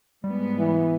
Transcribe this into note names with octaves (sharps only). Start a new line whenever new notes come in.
G#2 G3 B3
E3